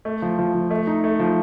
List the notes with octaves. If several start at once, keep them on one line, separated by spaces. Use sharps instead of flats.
A3
F3
F3
F3
A3
D#4
A3
F3